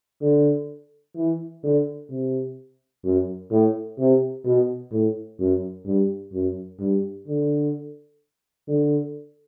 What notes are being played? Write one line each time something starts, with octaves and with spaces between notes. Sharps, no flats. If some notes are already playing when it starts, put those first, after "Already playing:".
D3
E3
D3
C3
F#2
A2
C3
B2
A2
F#2
G2
F#2
G2
D3
D3